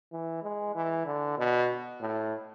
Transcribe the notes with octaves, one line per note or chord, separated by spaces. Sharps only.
E3
G#3
E3
D3
B2
A2